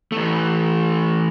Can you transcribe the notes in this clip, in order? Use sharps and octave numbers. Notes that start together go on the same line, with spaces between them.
E3 A3